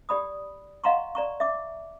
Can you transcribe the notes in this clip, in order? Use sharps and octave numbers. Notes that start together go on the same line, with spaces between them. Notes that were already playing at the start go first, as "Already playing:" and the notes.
G4 D5 B5 D#6
D#5 F5 F#5 A#5 C6 C#6
D5 A#5 C#6
E5 D6